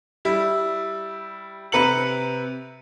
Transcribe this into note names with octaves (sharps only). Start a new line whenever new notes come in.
G3 E4
C3 B4 A#5 C#7 F#7